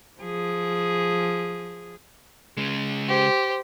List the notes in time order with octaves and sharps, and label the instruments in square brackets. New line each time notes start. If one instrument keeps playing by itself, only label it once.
[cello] F3 G#4
[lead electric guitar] C#3 G#3
[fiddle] G4 C5